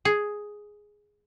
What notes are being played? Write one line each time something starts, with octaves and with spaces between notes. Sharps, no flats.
G#4